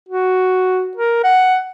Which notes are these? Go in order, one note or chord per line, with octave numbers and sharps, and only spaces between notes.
F#4
A#4
F#5